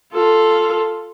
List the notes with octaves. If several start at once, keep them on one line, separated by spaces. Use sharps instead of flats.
F4 A4